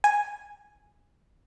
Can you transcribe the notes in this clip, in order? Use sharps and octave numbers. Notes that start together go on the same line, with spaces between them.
G#5